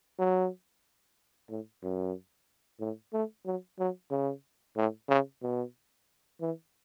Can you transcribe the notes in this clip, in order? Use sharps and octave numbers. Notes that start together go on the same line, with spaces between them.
F#3
A2
F#2
A2
A3
F#3
F#3
C#3
A2
C#3
B2
E3